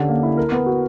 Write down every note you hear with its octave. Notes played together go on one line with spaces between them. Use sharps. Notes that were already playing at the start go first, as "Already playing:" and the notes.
Already playing: D3 C#4 G4
A#3
E4
A#4
B3
F#4